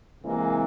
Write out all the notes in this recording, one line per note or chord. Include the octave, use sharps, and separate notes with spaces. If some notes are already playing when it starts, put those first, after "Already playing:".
C3 E3 G#3 A#3